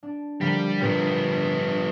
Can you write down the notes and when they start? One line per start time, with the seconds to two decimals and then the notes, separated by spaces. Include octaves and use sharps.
0.03 D4
0.41 D3 F3 G3 A#3
0.82 A#2 G3 B3